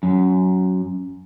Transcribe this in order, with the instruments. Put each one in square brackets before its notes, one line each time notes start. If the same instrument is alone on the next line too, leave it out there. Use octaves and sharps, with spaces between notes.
[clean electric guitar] F#2